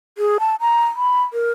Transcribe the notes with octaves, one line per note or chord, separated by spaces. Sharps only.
G#4
A5
A#5
B5
A#4